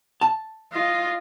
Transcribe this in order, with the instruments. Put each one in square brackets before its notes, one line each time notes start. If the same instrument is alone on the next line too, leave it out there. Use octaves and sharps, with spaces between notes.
[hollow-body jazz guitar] A5
[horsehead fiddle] F4 D#5